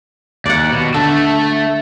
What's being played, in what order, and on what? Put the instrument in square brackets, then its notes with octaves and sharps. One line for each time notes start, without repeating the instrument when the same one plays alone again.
[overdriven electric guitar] D#2 [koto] D5 F#5
[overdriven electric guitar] B2
[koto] D3 [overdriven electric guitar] A3 A4